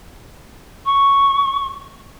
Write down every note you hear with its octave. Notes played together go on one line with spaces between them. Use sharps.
C#6